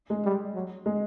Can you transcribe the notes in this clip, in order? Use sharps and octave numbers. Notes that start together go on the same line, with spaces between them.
G#3
G3
F#3
G#3